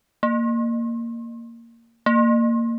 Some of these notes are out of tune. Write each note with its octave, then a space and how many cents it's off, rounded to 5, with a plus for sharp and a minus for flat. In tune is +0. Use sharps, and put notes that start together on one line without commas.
A#3 -10
A#3 -15